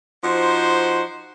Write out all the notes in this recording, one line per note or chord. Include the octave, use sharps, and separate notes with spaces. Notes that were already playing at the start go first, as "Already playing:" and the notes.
F3 D#4 F#4 C5